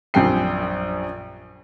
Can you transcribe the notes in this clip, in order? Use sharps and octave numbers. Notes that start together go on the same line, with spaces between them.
A#1 F#2 G3 G5 C7